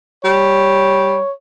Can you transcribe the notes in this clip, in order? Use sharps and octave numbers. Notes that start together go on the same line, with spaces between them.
G3 C#5